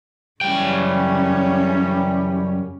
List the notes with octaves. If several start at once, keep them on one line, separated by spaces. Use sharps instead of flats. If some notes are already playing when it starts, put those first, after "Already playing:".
F#2 C#3 E3 G3 C#4 G5